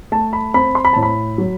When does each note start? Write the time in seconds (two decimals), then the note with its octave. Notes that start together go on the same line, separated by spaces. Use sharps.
0.12 A3 A5
0.33 B5
0.54 C4 B5
0.75 C6
0.85 B5
0.93 A2 A5
1.03 B5
1.38 F#3